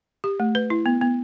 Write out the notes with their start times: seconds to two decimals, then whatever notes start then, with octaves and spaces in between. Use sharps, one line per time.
0.24 G4
0.40 A3
0.55 B4
0.70 E4
0.86 B3
1.02 B3